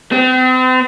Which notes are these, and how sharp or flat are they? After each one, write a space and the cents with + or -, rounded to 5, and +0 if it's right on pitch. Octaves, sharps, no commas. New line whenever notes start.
C4 -40